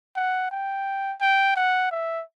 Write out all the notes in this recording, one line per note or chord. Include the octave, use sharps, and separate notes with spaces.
F#5
G5
G5
F#5
E5